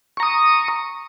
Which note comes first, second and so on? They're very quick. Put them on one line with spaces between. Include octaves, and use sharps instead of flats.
C#6 A#5 D#6